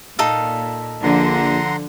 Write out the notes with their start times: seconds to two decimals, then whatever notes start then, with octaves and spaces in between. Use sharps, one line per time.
0.19 A#2 D#4 A4 F5
1.03 A#1 D3 F3 F#5 A#5 C6